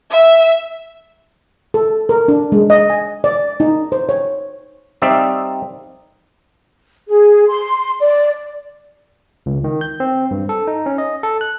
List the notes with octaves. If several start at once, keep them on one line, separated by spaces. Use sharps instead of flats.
E5
A4
A#4
D4
G#3
D#5
G#5
D5
D#4
C5
C#5
G3 C4 D#4 D5 E5 F5
G#4
C6
D5
C#2
D#3
G6
C4
G2
A4
D#4
C#4
D#5
A4
F#6